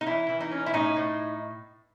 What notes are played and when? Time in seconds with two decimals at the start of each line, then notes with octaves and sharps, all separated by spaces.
0.01 D#4
0.07 E3 E4
0.29 E3
0.40 D#4
0.51 C#4
0.66 E4
0.74 A2 D#4
0.96 A2